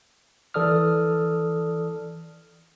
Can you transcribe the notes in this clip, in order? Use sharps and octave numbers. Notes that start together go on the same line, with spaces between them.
E3 A4 D5 D#6 F6